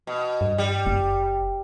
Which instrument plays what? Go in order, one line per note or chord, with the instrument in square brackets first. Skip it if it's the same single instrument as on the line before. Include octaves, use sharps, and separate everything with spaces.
[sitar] B2
[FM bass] G2
[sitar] G3
[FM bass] F#1